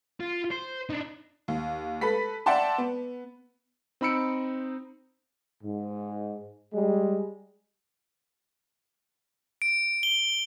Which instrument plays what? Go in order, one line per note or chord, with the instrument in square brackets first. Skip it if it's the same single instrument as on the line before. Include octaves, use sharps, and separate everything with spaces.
[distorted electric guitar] F4
C5
D4 D#4
[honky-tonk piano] D#2
A4 B4 B5 B6
D5 E5 F#5 G5 A5 C6
B3
[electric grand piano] C4 D#4 B5 E6 C#7 D7
[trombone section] G#2
G3 G#3
[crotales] D7
G7